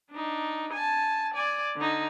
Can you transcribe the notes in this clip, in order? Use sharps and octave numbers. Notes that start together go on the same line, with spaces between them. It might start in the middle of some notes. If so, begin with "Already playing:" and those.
D4 D#4
G#5 A5
D5 G#5
D3 D#4